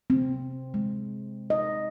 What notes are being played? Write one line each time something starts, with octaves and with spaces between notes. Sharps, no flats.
C4
G#3
D#5